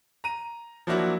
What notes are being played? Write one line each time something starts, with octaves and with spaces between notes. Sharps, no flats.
A#5 D#7
F3 F#3 A#3 D4 E4 F#4